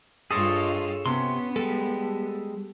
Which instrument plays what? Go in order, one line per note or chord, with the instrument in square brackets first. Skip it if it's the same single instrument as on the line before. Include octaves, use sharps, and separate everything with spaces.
[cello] G2 F4 [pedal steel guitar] G#4 A4 C#5 [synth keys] D#5 C6 A6
[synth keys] C3 [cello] B3 [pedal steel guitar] C#4 C6
[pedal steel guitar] G3 G#3 [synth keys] A4